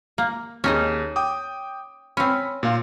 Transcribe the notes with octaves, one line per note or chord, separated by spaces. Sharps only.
A#3
D#2 C#4 D#4 G#4 D#5
G5 D6 D#6
C4 C#4 B5
A#2 F4 F5